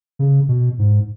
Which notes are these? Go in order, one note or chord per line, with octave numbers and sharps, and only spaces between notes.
C#3
B2
G#2